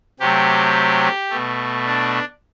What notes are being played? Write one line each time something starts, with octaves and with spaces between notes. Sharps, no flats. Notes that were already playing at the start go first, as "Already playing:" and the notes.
C3 F#3 A3 G4
B2 A3
D4